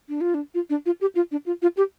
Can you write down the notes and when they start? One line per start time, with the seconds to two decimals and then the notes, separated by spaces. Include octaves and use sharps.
0.09 D4
0.21 F4
0.34 D4
0.54 F4
0.70 D4
0.86 F4
1.01 G4
1.15 F4
1.31 D4
1.46 F4
1.62 F4
1.77 G4